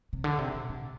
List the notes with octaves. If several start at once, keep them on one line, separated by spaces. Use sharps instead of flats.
C3
D3
C3
A#2
C3